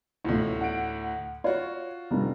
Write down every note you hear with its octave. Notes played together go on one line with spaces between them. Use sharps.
A1 D2 A2 F4
F#5 D7
F4 F#4 C#5
F1 G2 F3